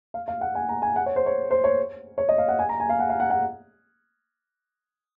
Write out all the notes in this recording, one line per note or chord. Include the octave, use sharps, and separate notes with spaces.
F5
F5
F#5
G#5
A#5
G#5
F#5
C#5
C5
C#5
C5
C#5
C#5
D#5
F5
F#5
G#5
A#5
G#5
F5
F#5
F5
F#5
F#5